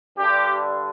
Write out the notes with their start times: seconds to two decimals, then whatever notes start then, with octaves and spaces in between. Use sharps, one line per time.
0.17 G2 D3 G4